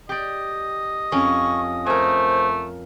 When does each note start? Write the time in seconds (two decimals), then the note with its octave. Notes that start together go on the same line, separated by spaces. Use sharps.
0.09 G4 D5 D#5
1.12 F2 C#4 C#6
1.86 A3 A#4 C5 G#5